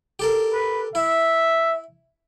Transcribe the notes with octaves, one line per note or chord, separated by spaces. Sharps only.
G4 A4 A#4
B4
E4 E5